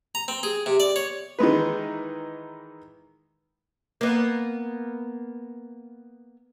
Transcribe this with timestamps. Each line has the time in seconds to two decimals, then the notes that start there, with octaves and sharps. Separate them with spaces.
0.15 A#5
0.28 C4
0.43 G#4
0.66 C3
0.80 D5
0.96 C#5
1.39 D#3 E3 G#3 B4
4.01 A#3 B3